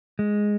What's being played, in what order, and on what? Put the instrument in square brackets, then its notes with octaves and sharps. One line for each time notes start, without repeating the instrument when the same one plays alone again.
[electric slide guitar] G#3